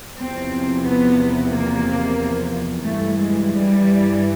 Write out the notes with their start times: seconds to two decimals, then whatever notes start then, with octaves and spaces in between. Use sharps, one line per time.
0.19 E2 C3 F3 C4
0.85 B3
1.52 A#3
2.85 G2 E3 A3
3.19 G#3
3.53 G3